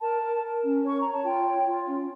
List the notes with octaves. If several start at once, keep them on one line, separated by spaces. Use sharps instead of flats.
A#4 A5
A#4
A#4
C#4
C#5 C#6
C#5 A#5
A5
F4 G5
C#5
F4
C#4